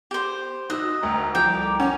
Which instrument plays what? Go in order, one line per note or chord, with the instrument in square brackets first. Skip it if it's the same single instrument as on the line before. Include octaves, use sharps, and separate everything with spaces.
[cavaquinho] G4 C5
[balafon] D#4 F#4 [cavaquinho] D#5 [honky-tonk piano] E6 F#6
[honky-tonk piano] D2 [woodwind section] A#4 G5 A#5
[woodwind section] C2 A#5 D6 [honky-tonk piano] F3 [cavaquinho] G5
[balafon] A4
[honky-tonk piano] C#4 [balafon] F#5